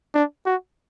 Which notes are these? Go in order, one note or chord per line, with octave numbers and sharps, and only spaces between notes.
D4
F#4